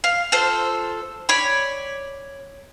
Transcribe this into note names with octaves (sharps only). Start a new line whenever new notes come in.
F5
F4 A4 C5
C#5 D5 B5